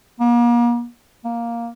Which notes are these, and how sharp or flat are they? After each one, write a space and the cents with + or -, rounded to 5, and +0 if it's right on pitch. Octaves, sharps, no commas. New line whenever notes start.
A#3 +40
A#3 +5